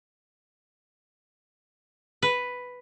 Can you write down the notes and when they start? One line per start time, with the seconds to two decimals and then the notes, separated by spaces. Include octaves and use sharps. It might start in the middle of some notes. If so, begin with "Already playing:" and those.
2.22 B4